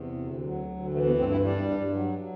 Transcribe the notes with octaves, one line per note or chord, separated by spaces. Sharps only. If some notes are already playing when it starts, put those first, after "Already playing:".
Already playing: E2 C3
D2
F#3
D2
E3 A3
B3
G2 C4
E4
G3 D4
G2
F#3
F#3